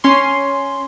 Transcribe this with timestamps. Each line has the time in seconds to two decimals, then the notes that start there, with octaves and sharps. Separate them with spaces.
0.04 C#4 C6